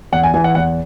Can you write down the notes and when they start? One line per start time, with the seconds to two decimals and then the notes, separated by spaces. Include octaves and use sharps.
0.12 E2 F#5
0.23 G#5
0.34 E3 G#5
0.44 F#5
0.55 E2 F#5